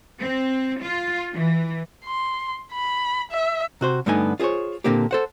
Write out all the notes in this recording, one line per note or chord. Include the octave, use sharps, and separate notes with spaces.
C4
F4
E3
C6
B5
E5
C3 F#4 C5
G2 D3 A3 B3 D#4 G#5
F4 G#4 A4 C5 C#5
A#2 D3 A#3 C4 D4 G4
A4 C5 F#5